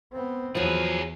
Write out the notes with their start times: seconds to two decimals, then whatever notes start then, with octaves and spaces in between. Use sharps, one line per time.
0.12 B3 C4
0.55 E2 F3 F#3 G#4 B4